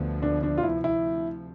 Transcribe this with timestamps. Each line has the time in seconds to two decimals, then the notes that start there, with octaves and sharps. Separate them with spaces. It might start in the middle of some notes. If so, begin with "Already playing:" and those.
Already playing: D2 D3 F3 B3
0.22 D4
0.43 D4
0.58 F4
0.63 D2 C3 F3 E4
0.84 E4